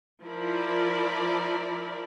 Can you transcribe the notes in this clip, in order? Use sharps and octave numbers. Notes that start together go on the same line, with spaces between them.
F3 E4 A#4 D5 B5